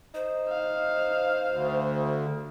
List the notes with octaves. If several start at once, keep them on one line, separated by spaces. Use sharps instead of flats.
D#4 C5
F5
D2